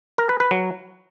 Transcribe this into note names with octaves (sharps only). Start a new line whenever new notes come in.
A#4
B4
B4
F#3